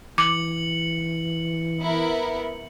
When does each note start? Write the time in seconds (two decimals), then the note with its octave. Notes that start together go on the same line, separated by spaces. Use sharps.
0.18 E3 D6 C#7 F#7
1.79 B3 E4 A#4